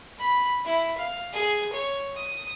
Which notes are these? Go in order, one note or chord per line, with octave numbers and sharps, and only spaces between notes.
B5
E4
F5
G#4
C#5
D#6